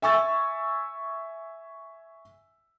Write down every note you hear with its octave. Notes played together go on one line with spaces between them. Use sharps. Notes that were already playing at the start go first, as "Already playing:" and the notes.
E5 G#5 C#6 E6 A6